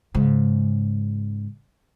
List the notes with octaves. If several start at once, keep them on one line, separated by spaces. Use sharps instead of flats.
G#2 C#3